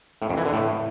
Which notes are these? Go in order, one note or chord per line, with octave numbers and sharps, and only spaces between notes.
A2
F2
E3
D3
A2